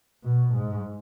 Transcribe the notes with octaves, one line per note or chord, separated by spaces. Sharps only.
B2
G#2